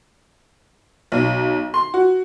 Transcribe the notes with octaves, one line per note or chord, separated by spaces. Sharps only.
B1
C6
F#4